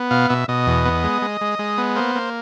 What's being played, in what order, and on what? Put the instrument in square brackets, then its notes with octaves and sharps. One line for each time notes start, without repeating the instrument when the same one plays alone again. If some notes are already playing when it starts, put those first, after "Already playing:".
Already playing: [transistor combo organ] B3
B2 F5
B2 E5
B2 D#5
E2
B3
G#3
G#3
G#3
G#3
B3
A#3 C5
A#3